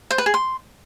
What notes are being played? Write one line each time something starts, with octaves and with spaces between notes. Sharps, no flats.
C5
B4
G#4
C6